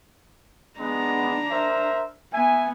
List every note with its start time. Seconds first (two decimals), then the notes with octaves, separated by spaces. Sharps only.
0.80 G#3 B3 D4 A#5
1.51 A#4 C5 E5
2.33 B3 E5 G#5